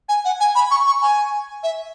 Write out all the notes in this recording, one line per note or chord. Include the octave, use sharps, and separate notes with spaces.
G#5
F#5
G#5
B5
C#6
C#6
G#5
E5